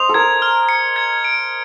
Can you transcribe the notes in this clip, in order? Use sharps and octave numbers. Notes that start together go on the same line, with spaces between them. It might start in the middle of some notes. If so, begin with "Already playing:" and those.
Already playing: C5 D#5 F7
A4
A#4 G#6
F6
C#7
G#6
D7